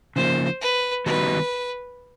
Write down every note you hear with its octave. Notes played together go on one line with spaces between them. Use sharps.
C#3 F3 A#3 C5
B4
D#3 G3 B3 D#4 F#4 B4